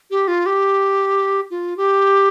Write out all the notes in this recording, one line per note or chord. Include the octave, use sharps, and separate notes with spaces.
G4
F4
G4
F4
G4